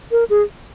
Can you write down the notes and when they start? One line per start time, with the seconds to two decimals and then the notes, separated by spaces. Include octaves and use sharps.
0.12 A#4
0.30 G#4